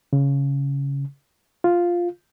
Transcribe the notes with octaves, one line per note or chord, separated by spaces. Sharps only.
C#3
F4